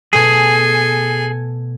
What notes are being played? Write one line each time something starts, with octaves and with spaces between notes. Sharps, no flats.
B2 A3 G#4 A4 G#5